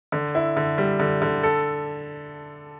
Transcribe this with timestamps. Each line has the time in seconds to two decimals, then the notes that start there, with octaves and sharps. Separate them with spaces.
0.12 D3
0.35 E4
0.57 D3
0.78 G3
1.00 D3
1.22 D3
1.43 A4